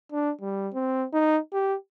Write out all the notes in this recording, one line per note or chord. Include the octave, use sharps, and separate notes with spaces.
D4
G3
C4
D#4
G4